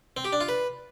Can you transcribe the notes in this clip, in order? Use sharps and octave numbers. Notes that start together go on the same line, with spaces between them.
C4
G4
D4
F4
B4